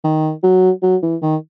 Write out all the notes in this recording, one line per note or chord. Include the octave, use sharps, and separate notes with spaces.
D#3
F#3
F#3
E3
D#3